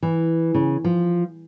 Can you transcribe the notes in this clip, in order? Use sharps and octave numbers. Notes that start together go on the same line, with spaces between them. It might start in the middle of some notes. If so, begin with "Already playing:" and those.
E3
C#3
F3